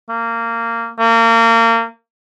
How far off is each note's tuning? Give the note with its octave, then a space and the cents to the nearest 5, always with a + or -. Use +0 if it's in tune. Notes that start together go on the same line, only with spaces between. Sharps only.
A#3 -20
A#3 -30